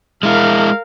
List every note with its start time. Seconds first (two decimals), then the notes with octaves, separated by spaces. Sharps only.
0.23 G#3 E4 A#4 F5